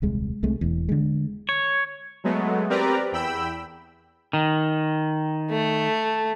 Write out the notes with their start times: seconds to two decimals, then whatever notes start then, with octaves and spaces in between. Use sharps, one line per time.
0.02 D#1 C2 G#3
0.43 C2 C3 G#3 A3
0.61 E1 E2
0.89 D3 G#3
1.49 C#5
2.24 F#3 G#3 A3 B3
2.69 C4 G4 A#4 B4 D5 A#5
3.12 E2 G5 B5 E6
4.33 D#3
5.50 A3